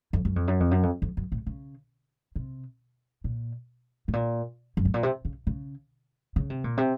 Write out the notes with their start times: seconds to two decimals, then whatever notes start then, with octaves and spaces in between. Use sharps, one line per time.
0.13 F2
0.25 F#2
0.36 F2
0.48 F#2
0.60 F2
0.71 F#2
0.83 F2
1.02 F2
1.17 F#2
1.32 A2
1.47 C#3
2.36 C3
3.24 A#2
4.08 A2
4.13 A#2
4.77 F#2
4.85 A2
4.94 A#2
5.03 C3
5.25 C#3
5.47 C#3
6.36 C#3
6.50 C3
6.64 A#2
6.77 C3